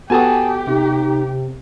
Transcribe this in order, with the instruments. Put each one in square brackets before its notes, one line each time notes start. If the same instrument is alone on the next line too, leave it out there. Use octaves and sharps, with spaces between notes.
[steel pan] B3 F#4 A4 [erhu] G4 [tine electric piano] G#5 A5 D#6
[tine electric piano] C3 [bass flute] D#4